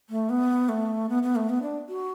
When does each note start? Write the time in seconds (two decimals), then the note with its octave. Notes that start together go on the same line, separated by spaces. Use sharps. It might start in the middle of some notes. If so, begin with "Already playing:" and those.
0.10 A3
0.30 B3
0.69 A3
1.09 B3
1.23 B3
1.36 A3
1.49 B3
1.62 D4
1.89 F#4